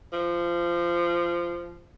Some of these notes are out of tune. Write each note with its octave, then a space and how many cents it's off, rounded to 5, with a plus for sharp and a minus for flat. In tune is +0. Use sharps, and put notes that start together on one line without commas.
F3 -20